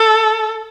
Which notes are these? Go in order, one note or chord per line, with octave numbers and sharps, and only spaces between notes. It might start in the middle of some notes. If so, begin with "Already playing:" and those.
Already playing: A4